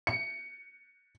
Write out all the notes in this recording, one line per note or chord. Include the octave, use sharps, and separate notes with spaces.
C#7